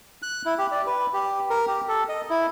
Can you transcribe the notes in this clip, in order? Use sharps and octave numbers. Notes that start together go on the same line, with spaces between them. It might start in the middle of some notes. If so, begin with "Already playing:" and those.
F#6
E4
G4
D5
B4
G4
A#4
G4
A4
D#5
E4